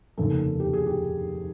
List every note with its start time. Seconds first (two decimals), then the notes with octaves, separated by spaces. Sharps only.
0.18 F1 D#2 C#3 A4
0.60 G4
0.73 G#4
0.86 G4